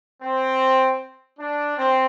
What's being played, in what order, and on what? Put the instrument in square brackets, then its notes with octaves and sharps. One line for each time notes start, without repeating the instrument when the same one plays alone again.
[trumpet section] C4
D4
C4